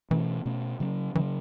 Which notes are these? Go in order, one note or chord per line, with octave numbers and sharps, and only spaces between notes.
B2 E3 A3 C#4
B2 A3 C#4
C#3 F#3 C#4
C#3 E3 F#3 C#4